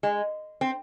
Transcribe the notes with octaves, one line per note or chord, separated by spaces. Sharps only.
G#3
C4